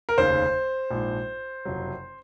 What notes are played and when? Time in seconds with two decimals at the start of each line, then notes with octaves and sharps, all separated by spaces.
0.09 A#4
0.18 F1 D#2 C#3 C5
0.91 A#1 G#2 F3
1.65 F#1 F2 C3 F#3